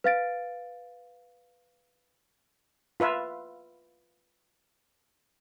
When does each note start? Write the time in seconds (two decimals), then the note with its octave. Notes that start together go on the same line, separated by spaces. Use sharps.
0.04 B4 F5 A6 D7
3.00 F4 B4 E5 F5